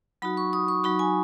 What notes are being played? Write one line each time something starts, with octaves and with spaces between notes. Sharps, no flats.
F#3 D#4 F#4 B5
C#6
D#6
C#6
F#3 D#4 F#4 B5
G#5